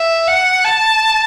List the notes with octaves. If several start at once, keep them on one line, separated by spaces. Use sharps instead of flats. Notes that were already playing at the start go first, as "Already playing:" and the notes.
Already playing: E5
F#5
A5